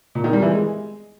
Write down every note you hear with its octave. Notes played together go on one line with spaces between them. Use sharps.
A#2
D#3
G3
E3
G#3